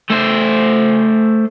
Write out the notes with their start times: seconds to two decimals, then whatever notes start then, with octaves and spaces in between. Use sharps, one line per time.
0.10 A3 C5